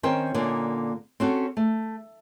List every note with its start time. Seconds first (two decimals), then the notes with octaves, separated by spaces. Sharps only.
0.03 D#3 C4 C#4 A#4 C5 G5
0.34 A#2 D3 A#3 C#4 D#4
1.20 C4 C#4 F#4 A4
1.57 A3